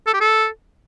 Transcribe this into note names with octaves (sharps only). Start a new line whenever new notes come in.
A4
G4
A4